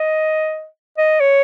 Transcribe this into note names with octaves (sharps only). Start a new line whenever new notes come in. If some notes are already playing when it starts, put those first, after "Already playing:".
Already playing: D#5
D#5
C#5